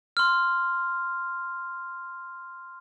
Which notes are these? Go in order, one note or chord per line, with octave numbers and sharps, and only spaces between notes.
C6 F6